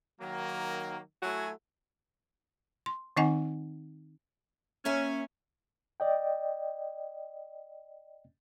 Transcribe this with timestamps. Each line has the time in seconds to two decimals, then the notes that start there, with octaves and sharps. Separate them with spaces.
0.21 D#3 F#3 A#3
1.23 F#3 A3 E4 F#4 G#5
2.86 C6
3.17 D#3 C4 D#4 D#5 F#5 G#5
4.85 A#3 C#4 E5 G#5
6.00 D5 D#5 G5